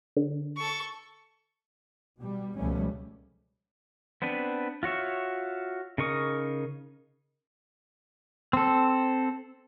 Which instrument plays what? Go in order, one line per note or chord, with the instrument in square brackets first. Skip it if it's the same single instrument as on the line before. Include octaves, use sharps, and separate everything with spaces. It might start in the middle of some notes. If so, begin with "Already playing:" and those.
[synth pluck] D3
[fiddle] A4 C#6
[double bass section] B2 G3
C#2 B2 F3 G3 A3 C#4
[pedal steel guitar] B3 C4 D4 B4
F4 F#4 C#5 E5
C#3 D#4 A#4 C#6 D#6
C4 A4